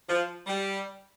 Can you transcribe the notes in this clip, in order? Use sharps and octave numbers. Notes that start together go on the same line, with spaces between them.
F3
G3